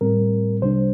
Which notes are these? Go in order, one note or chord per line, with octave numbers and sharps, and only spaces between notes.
A2 G3 C4 A#4
C2 C3 G3 D4 C5